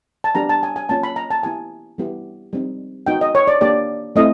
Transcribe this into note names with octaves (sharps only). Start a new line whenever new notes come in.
A5
G3 B3 D4 G4 A#5
A5
G#5
G#5
A#3 C#4 F4 A5
B5
A#5
A5
B3 E4 G4 G#5
G3 B3 E4 G4
G3 C4 D#4
B3 D#4 F#4 G5
D#5
C#5
D5
A#3 D4 G4 D5
A3 C4 E4 D#5